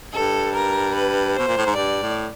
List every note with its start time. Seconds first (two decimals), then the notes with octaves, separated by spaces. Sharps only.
0.13 G2 A4
0.53 A#4
0.95 B4
1.35 B2 C5
1.48 A#2
1.58 A2
1.66 G#2
1.75 G2 D5
2.02 A2